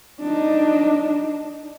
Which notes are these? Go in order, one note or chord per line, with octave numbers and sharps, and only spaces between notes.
D4 D#4